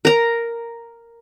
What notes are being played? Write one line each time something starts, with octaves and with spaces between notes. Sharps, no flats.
A#4 A#5